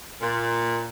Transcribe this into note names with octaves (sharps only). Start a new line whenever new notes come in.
A#2